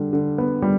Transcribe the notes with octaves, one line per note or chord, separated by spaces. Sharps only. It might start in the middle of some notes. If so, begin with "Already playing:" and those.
Already playing: D3 G3
D3
B3
G3